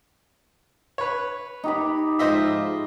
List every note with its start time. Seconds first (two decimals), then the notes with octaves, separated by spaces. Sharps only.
0.98 B4 C#5
1.64 D#4 G4 B5
2.19 G#2 F3 F4 C5 D#5 E5